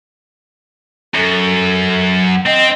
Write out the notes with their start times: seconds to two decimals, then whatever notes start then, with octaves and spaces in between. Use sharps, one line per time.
1.15 F#2 A4
2.26 F#5
2.46 C4 D#5